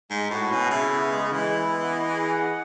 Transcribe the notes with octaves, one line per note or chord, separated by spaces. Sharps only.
G#2 G#3
A2 F#4
B2 C#4
C#3 E4
B3
G#3
E3 G#3
E4
B3
D#5
G#4
F#5